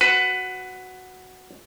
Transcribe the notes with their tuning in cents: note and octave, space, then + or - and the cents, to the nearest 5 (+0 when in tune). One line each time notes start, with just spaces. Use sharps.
F#4 +0 B4 +15